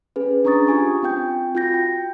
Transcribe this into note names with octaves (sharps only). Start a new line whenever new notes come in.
C#4 G#4 B4
C#4 D4 A#5 C#6 D#6 A6
F4 G4 G#5 C#6
C4 F4 G5 G6
F4 F#4 G6 A#6
G5